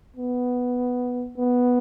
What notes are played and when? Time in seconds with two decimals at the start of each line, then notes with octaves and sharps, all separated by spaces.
0.17 B3
1.38 B3